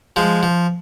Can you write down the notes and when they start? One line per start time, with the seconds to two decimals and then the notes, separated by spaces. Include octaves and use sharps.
0.16 F3 G#3
0.43 F3